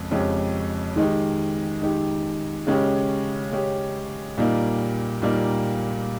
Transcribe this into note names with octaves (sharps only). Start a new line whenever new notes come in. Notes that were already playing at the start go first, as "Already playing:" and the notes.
Already playing: F2 C#3 G#3
F2 C#3 G#3 C#4 G4
D#3 G#3 D#4 G4
D#3 G#3 D#4 G4
C#3 G#3 C#4 G4
C#3 G#3 C#4 G4
A#2 G3 A#3 D#4
A#2 G3 A#3 D#4